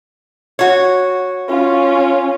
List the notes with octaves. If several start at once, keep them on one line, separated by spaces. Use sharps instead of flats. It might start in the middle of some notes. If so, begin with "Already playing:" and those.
F#4 C#5
C#4 F4